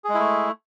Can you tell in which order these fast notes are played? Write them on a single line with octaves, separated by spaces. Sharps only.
G#4 G#3 E4 A3